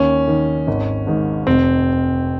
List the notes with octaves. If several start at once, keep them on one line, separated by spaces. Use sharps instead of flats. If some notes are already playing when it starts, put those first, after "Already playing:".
Already playing: D#2 C#4
D#3
G#1
G#2 D#3
F1 C4